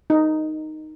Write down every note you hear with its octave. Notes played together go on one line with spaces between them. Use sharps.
D#4